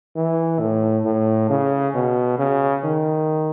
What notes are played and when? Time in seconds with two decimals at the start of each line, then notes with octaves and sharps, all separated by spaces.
0.16 E3
0.60 A2
1.05 A2
1.50 C#3
1.95 B2
2.39 C#3
2.84 D#3